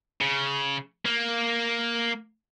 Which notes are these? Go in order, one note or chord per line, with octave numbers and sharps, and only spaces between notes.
C#3
A#3